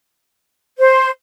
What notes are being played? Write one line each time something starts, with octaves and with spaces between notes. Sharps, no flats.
C5